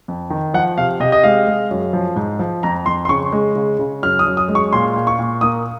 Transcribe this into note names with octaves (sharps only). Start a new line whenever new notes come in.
F2
D#3
F3 F#5
C3 F5
C3 D#5
D#5
G#3 F5
G#3
F#2
F3
G#2
F3
F2 A#5
F2 C6
C6
C#3 C#6
G#3
C#3
C#3
F#2 F6
D#6
F#2
D#6
G#3
C#6
A#2 C6
A#2
C#6
A#2
A#3 D#6